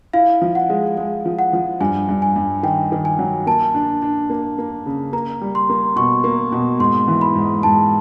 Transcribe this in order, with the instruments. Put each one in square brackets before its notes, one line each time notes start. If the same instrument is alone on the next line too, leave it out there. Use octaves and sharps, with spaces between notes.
[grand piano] E4 [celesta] F5
[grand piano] F3
[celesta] F#5
[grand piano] G#3
G#3
F3
[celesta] F#5
[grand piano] F3
[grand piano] G2 [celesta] G#5
[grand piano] G2
[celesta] G#5
[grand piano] G2
[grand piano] D#3 [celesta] G5
[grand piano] D#3
[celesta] G#5
[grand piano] F#3
[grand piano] A#3 [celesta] A5
[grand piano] D4
D4
A#3
A#3
C#3
[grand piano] A#3 [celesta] A#5
[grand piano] G3
[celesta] C6
[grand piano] A#3
[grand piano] B2 [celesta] C#6
[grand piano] A#3
B2
[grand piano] G#2 [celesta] C6
[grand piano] E3
[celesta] B5
[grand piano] G#2
[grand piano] G#2 [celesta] A5